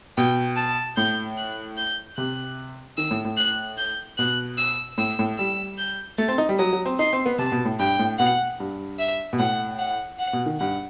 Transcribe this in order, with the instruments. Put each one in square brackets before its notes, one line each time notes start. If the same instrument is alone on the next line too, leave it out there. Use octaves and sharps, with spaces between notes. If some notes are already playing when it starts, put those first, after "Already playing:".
[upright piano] B2 [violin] G5
[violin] A5
[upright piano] A2 [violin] G6
[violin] F#6
G6
[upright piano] C3 [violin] F#6
[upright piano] D#3 [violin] E6
[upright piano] A2
A2
[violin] F#6
G6
[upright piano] B2 [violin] F#6
[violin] E6
[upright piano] A2 [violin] E6
[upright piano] A2
[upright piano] G3 [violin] E6
[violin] G6
[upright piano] A3 [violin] A6
[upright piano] C4
D#4
G3
[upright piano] F#3 [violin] D#6
[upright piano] F#3
C4
[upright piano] D#4 [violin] C6
[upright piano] C4
B3
[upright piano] C3 [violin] A5
[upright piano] B2
A2
[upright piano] G2 [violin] G5
[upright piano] A2
[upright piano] B2 [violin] F#5
[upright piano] G2
[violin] E5
[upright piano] B2
[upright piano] A2 [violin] F#5
[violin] F#5
F#5
[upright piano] B2
D#3
[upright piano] G2 [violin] F#5